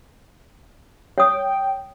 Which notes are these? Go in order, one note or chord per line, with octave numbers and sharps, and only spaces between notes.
C#5 G5 D#6